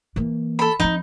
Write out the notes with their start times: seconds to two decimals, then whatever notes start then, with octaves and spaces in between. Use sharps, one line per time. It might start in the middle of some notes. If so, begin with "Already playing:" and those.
0.16 E3 A#3
0.59 A4 B5
0.80 F3 C4 D#4